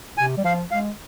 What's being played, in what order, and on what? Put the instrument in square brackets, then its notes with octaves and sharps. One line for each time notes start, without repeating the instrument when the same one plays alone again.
[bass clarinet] C3 [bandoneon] G#5
[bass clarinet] G3
[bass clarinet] F3 [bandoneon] F5
[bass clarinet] G#3 [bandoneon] F5